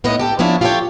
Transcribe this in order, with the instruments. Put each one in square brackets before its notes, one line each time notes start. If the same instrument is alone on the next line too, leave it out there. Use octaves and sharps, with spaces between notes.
[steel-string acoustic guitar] A2 B3 D#4 B4 D#5
G4 A4 G5
F3 B3 C#4 D4 E4
F4 G4 A4 B4 C#5 G5